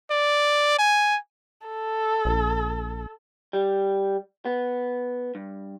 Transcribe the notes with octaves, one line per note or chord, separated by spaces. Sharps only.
D5
G#5
A4
A#1
G3
B3
G2